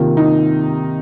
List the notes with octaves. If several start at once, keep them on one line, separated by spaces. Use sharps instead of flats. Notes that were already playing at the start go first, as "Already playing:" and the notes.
Already playing: C3 D#3 A#3 F4
D#4